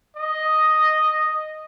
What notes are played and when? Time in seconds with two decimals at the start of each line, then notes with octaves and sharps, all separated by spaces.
0.16 D#5